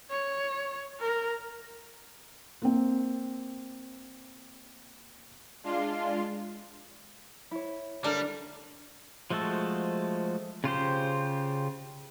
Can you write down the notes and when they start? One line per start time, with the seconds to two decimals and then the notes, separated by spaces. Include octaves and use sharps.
0.10 C#5
1.00 A#4
2.62 A#3 C4
5.64 G#3 D4 F4 F5 C6
7.51 E4 C#5
8.04 D3 G3 A#3 D4 A#4
9.30 F3 G#3 A3 F#4 A4
10.64 C#3 F4 G4 C5